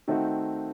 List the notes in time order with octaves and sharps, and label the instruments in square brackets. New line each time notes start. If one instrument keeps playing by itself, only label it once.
[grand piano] D#3 A3 C4 D#4 F#4